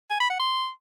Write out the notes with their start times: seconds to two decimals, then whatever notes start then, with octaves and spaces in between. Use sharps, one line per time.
0.10 G#5
0.20 B5
0.30 F#5
0.39 C6